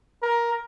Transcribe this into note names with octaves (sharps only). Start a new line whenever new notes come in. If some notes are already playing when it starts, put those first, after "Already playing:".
A#4